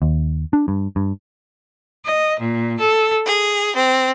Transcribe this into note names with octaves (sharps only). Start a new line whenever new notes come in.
D#2
D4
G2
G2
D#5
A#2
A4
G#4
C4